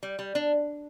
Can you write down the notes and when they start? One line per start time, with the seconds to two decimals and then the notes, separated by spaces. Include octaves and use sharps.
0.03 G3
0.19 G3
0.35 D4